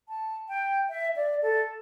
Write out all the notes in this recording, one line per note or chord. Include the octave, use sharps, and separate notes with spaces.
A5
G5
E5
D5
A4